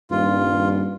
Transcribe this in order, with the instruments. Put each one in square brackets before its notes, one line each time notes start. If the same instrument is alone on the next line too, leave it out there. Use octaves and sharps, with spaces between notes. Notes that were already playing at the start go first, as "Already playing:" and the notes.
[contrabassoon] D#1 [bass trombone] G2 [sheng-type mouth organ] F4